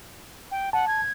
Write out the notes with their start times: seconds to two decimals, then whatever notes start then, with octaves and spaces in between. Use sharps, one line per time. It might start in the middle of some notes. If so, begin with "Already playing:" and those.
0.51 G5
0.73 F#5 A5
0.88 G#6